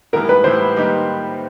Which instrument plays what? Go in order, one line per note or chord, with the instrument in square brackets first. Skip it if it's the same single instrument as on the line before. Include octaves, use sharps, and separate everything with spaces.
[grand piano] A2 E3 G3 B3 E4 [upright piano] A#4
[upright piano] B4
[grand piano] A2 E3 G3 B3 E4 [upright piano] C5
[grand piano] D#3 G3 A#3 D#4 G4